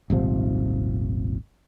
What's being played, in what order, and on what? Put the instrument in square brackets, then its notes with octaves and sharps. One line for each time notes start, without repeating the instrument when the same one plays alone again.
[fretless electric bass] D#1 G#1 C3 F3